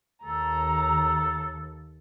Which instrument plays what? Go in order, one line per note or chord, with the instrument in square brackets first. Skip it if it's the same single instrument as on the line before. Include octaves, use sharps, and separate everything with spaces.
[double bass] D#2 [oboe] A4 [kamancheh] A#5